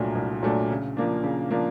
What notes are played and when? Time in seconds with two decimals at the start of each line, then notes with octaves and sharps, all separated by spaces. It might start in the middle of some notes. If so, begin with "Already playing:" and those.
Already playing: C2 A#2 F#3 A3 D4
0.15 C2
0.43 A#2 F#3 A3 D4
0.70 C#3
0.97 F3 A#3 D4
1.24 C#3
1.51 F3 A#3 D4